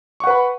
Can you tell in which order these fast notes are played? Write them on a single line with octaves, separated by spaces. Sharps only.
C#6 F#5 B4 B5